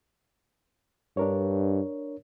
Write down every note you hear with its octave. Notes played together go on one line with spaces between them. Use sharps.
G2 D4 A#4 C#5